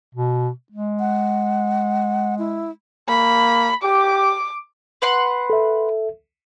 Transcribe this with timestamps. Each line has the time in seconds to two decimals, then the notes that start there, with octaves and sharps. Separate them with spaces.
0.15 B2
0.72 G#3
0.99 F#5
2.39 E4
3.09 A#3 B5
3.83 G4 D6
5.02 B4 F#5 C6
5.50 A4 E5